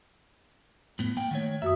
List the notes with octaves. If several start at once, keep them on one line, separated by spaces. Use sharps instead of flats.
A2 B3
A#3 F#5 G5
D#3 A3 C#5
F#2 F#4 E5 D#6